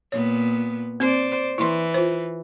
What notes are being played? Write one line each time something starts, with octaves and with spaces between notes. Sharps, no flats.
A#2 B3 C#5
C4 C5 D5
E3 E4 C6
F4 C5